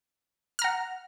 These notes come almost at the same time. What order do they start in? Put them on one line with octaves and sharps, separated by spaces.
F6 A#5 F#5